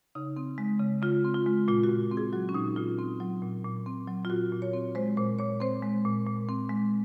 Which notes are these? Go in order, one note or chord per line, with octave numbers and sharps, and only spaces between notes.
C#3 D#4
C4
G#3
C#3
C#3 F4
C4
F4
G#3
A#2 F4
F#4
A#2
C4
G#4
F#3 F#4
C#4
A#2 D#4
A#2 F4
C4
F#3
A#2
A#2
C4
F#3
F4
A#2 F#4
A#2
C#5
C4
G#3 C5
A#2 C5
A#2 C#5
C4 C5
G#3
A#2
A#2
C4
G#3